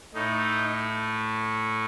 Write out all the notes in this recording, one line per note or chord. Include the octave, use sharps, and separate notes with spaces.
A2 A3 D#4